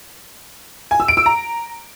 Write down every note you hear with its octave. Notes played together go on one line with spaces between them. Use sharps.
G#5
E6
D7
E6
A#5